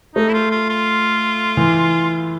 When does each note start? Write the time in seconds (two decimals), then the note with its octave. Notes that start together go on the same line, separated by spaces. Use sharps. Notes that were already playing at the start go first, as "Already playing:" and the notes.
0.15 A3 D#4
0.29 E4
0.33 F4
0.51 F4
0.69 F4
1.57 E3